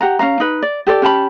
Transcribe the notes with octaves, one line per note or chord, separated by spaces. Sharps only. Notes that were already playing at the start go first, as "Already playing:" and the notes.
G4 F#5 A#5
C#4 D4 F5 A#5
D#4 B4
D5
G4 A4 C5 D5
C#4 G4 A5 B5